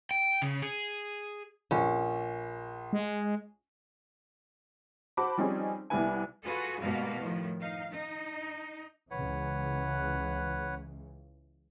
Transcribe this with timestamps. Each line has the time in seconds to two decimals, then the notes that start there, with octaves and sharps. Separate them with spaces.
0.11 G5
0.42 C#3
0.62 G#4
1.71 A#1 C#4
2.93 G#3
5.17 F#4 C5 A5 B5 D6
5.37 F3 G3 C4 C#4 D#4 G#4
5.90 C2 G3 B3 E4 B4 G#5
6.44 F4 F#4 G#4 A4 B4
6.81 G#2 B2 G3 A#3 F#4 F5
7.20 A2 D#3 F3
7.61 D#4 F5
7.92 D#4
9.11 C#2 C#3 E3 B4 C#5 F#5